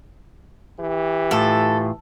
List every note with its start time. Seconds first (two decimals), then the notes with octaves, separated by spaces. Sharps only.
0.80 E3 G4
1.31 A2 F4 A4